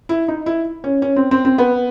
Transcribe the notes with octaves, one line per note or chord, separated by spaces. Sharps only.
E4
D#4
E4
C#4
C#4
C4
C4
C4
B3